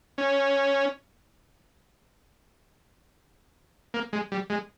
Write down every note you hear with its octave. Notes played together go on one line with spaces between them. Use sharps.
C#4
A#3
G#3
G3
G#3